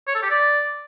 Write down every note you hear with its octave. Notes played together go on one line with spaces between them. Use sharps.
C#5
A4
G4
D5